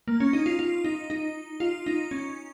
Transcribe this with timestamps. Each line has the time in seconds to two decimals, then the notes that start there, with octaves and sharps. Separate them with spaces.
0.08 A#3
0.20 C#4
0.33 D#4
0.46 F4
0.59 F4
0.85 D#4
1.10 D#4
1.60 F4
1.86 D#4
2.11 C#4